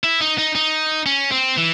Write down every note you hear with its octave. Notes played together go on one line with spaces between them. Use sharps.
E4
D#4
D#4
D#4
C#4
C4
E3